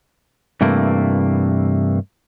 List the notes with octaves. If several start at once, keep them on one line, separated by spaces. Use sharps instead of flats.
G2 C3 E3 A3 A#3